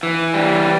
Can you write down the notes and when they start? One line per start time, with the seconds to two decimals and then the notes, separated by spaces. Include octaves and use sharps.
0.03 E3
0.34 G3